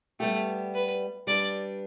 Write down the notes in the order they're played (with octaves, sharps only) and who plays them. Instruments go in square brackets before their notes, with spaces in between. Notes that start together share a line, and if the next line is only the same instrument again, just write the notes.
[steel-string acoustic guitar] G3 B3 G4 [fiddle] A3
[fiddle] B4
[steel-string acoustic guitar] G3 D4 B4 [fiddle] D5